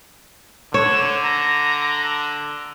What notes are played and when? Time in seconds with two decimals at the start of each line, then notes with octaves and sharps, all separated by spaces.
0.74 D3 C#5 E7
1.23 A#5